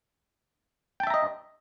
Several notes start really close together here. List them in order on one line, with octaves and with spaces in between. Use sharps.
G5 A5 E5 A#5 D#5